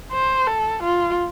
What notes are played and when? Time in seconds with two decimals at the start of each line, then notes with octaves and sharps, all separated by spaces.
0.12 C5
0.47 A4
0.83 F4